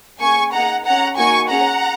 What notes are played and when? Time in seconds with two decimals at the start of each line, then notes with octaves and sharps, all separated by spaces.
0.20 A#3 C#4 G#4 G#5 C#6
0.53 A#3 D#4 G#4 F#5 A#5
0.85 C#4 G#4 F#5 A#5
1.17 A#3 D#4 F#4 G#5 C#6
1.49 C#4 G#4 F#5 A#5